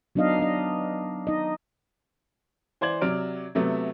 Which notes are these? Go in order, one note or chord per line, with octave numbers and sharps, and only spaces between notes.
F#3 B3 D4 D#4 D#5 F5
D4 D#5
D#4 D#5
E3 C5 D5 G#6 F#7
C3 F#3 D5 F6 D7
C3 F#3 A3 B3